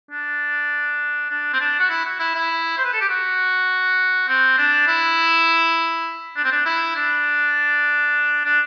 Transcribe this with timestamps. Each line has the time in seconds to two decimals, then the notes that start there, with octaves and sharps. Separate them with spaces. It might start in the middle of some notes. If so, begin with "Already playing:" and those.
0.11 D4
1.30 D4
1.53 C4
1.60 D4
1.79 F#4
1.90 E4
2.05 F#4
2.19 E4
2.35 E4
2.78 C5
2.85 B4
2.93 A4
3.01 G4
3.09 F#4
4.28 C4
4.58 D4
4.87 E4
6.37 D4
6.44 C4
6.52 D4
6.66 E4
6.96 D4
8.45 D4